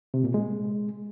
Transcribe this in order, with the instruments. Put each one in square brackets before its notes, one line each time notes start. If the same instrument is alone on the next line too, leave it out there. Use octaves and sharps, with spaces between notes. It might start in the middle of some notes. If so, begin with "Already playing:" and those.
[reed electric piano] C3
A#2
G#3